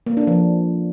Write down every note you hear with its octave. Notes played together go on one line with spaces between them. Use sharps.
A#3
D4
F3